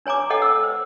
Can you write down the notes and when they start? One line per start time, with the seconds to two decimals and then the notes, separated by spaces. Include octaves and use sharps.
0.06 D4 C#5 G#5 A#5 D6
0.30 A4 C#5 D#5 F#5 G5
0.42 F#5 E6
0.64 C5